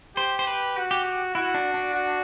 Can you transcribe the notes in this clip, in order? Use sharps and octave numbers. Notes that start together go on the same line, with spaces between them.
G4 C5
C5
B4
F#4
G4
G4
E4 F#4
D4
D4
F#4